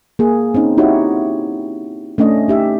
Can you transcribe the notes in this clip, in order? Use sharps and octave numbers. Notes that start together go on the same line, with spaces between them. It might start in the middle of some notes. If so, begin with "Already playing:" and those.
A#3 G#4
C4 C#4 D#4
D#4 E4 F#4 G4 C#5
A3 C#4 D4 D#5
D#4 G4 E5